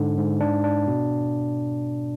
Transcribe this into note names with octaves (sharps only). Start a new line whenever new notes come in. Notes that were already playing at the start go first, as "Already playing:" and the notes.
Already playing: G#2 D3
G#2
D4
D4
B2